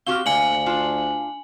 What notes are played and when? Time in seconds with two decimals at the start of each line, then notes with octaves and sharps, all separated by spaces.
0.07 C4 F#4 G4 F5 C#6 F6 G7
0.26 D2 D3 A#3 E5 F5 G#5 F#7
0.66 D4 F4